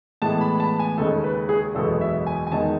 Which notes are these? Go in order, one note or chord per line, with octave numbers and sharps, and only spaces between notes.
A2 E3 G#3 B3 A5
B5
B5
A5
G#5
D#2 C#3 G#3 D#4 A4
B4
G#4
F#1 E2 B2 G#3 B3 A4
E5
G#5
G#5
E2 D#3 G#3 D#4 A5